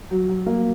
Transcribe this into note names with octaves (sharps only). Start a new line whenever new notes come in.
F#3
F#3
A#3